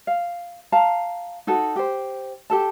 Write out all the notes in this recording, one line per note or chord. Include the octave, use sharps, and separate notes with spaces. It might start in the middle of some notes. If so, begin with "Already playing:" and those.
F5
F5 A5 A#5
D#4 F#4 A4
G4 C5
G4 A4 A5